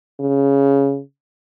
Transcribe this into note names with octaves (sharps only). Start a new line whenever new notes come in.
C#3